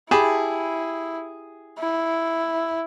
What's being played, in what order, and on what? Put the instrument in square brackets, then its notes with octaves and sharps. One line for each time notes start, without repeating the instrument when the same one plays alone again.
[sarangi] E4 [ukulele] G4 A5 B5 [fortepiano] G#4
[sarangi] E4